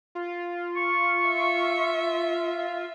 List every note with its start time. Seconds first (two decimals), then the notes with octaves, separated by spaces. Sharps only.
0.15 F4
0.76 C#6
1.27 E5